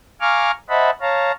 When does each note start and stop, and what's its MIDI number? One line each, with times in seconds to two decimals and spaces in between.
0.21 0.51 77
0.21 0.51 80
0.21 0.51 82
0.21 0.51 85
0.21 0.51 86
0.21 0.51 89
0.69 0.90 72
0.69 0.90 75
0.69 0.90 76
0.69 0.90 78
0.69 0.90 81
0.69 0.90 83
1.01 1.32 73
1.01 1.32 77
1.01 1.32 81
1.01 1.32 82